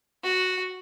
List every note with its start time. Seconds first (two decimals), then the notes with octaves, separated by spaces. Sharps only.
0.24 F#4